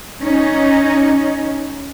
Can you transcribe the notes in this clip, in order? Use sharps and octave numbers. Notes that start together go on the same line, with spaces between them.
C#4 D#4